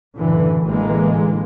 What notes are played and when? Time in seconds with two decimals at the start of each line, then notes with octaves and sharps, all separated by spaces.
0.16 F#1 A2 D3 E3
0.65 A1 D3 E3 G#3 A#3